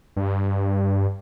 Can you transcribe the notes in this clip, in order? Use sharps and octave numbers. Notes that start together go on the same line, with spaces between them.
G2